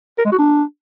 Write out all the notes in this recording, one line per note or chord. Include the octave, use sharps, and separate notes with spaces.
A#4
G#3
F#4
D4